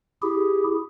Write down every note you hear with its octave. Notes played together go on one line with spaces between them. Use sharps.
E4 G4 G#4